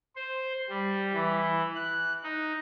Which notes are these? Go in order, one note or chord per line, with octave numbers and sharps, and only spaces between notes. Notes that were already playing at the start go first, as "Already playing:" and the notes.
C5
G3
E3
F#6
D#4